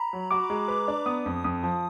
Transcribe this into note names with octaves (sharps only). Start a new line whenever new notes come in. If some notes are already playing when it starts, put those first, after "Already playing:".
Already playing: A#5 B5
F#3
F#4 D6
G#3
B4
D4
B3 D#6
F2
F2 D#6
F3